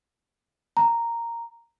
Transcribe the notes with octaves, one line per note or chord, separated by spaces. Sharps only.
A#5